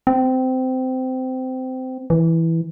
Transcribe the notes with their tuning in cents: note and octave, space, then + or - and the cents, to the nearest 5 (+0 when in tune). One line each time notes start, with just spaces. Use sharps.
C4 -20
E3 -5